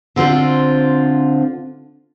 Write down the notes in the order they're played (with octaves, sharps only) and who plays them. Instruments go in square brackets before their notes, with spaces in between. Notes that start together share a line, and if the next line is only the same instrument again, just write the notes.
[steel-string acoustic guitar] D3 C4 F4 C5